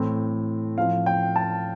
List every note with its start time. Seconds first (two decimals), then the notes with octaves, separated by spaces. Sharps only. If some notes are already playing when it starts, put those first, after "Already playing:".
Already playing: A2 E3 A3 C4
0.78 A2 F3 C4 F5
1.06 G5
1.36 A5